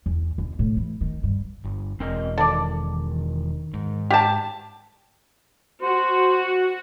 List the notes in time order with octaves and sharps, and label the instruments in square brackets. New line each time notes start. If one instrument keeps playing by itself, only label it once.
[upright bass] E2
D#2
A2
E3
D#3
G2
[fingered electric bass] G1
[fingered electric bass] E1 [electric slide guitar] C4 A#4 D#5
[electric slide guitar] D#3 [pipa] A4 D5
[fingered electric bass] G#2
[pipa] G4 A5
[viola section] F#4 [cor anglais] C5